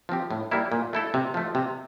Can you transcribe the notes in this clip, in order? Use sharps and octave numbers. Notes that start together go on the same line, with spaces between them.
F3 C4 G4
A2
G3 A#3 E4
A#2
A3 E4 A4
C3
F3 A3
C3